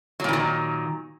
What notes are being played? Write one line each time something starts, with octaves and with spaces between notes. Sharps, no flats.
A#2 D#3 E3 F#3